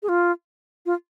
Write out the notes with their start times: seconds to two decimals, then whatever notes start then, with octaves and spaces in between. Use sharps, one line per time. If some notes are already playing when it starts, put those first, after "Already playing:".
0.03 G#4
0.09 F4
0.86 F4